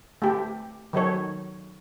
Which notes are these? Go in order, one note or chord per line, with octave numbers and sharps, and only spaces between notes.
A3 G4
D#3 F#3 A4 C#5